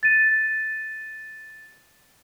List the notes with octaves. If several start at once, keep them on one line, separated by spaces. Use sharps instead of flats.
A6 D#7